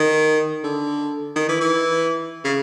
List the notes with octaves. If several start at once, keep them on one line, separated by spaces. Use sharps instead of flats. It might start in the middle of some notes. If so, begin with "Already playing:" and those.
Already playing: D#3
D3
D#3
E3
E3
C#3